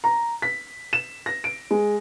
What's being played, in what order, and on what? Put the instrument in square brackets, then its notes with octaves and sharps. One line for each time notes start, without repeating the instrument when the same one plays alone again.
[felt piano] A#5
B6
E7
A#6
D7
G#3